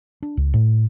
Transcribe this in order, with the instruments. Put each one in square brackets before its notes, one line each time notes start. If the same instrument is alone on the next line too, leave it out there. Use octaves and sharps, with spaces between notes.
[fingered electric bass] D4
C#2
A2